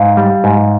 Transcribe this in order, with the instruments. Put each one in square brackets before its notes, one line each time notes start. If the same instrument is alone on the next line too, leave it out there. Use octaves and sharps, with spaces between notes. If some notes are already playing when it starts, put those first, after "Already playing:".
Already playing: [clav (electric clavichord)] G#2 [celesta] F5
[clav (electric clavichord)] G3
G#2